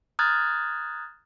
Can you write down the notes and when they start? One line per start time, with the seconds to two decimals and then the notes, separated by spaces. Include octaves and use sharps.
0.19 A#5 D#6 F6 F#6 G#6 A6